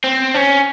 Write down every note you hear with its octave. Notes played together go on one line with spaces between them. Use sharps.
C4
C#4